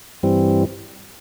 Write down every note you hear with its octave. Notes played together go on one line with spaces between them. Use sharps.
G2 E3 G3 C4